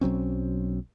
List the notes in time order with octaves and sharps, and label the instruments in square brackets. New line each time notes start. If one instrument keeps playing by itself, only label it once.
[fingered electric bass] B1 F#3 C4 C#4